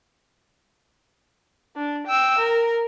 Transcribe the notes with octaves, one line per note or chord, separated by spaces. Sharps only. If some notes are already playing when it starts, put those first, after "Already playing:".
D4
G5 E6
A#4